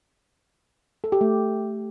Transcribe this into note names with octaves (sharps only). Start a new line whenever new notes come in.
A4
G4
A3